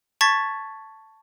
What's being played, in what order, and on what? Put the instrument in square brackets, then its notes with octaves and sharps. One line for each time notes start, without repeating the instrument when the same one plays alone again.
[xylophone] A5 C#6 G#6 A6 B6